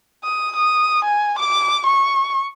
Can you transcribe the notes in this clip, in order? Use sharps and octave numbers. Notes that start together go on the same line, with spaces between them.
D#6
D#6
G#5
D6
C#6